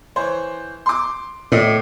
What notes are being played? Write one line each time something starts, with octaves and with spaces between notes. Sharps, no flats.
E3 C5 C#5
C6 D6
A2 D5 D#5